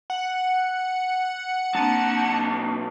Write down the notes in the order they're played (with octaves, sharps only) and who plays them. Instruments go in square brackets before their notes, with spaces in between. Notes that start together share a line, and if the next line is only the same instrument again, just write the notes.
[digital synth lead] F#5
[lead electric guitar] B1 A5 [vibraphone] A#3 C4 D4